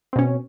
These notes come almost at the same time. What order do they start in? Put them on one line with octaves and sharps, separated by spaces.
C4 B2 C#4